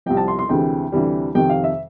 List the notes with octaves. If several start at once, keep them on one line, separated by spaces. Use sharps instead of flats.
C2 C3 F3 G5
A5
C6
C6
D2 C3 E3 G#3 G5
D2 C3 E3 G3
F2 C3 D#3 G5
F5
E5